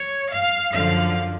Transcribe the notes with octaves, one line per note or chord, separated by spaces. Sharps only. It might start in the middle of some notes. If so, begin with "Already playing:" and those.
Already playing: C#5
F5
F#2 D3 F3 F5